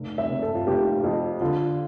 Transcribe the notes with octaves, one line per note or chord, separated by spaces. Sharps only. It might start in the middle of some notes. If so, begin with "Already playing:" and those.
Already playing: F1
E5
C3
A4
F4
F1 G4
F2
D3 F4